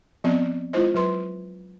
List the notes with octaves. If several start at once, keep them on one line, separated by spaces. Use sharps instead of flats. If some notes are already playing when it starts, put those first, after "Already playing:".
F3 B3 C4 D5 D#5
G#3 E4 F4 C5 D#5
F#3 B4 C6